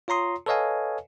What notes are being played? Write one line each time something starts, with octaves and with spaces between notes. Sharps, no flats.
F4 C#5 A#5 C6 D#6
A4 B4 C#5 D#5 F5 G#5